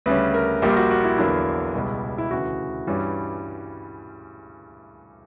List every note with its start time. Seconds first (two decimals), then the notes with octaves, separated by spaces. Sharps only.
0.06 D2 C#3 G3 C#4 B4
0.34 A#4
0.62 A#1 A#2 G3 A#3 G4
0.76 F#4
0.91 F#4
1.04 E4
1.18 E2 D3 F#3 A#3 D4 E4
1.74 C#2 B2 G3
2.18 E4
2.31 D2 C#3 E3 F#4
2.87 G2 E3 G3 C#4